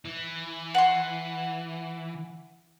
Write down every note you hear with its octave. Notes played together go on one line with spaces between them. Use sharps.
E3
F#5 C6